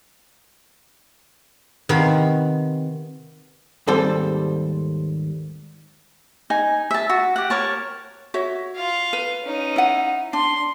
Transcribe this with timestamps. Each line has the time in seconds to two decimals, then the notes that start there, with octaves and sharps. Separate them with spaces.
1.89 C3 D#3 B3 F5 B5
3.87 D#2 G#2 G3 C4 A4 C5
6.50 D#4 G#5
6.91 E5 A5
7.10 F#4
7.36 G4 F#5
7.50 A#4 C#5 A5
8.34 F#4 C#5 E5
8.76 F4 F5
9.13 B4
9.44 C#4 D#4
9.76 E4 F#5
10.33 D4 C6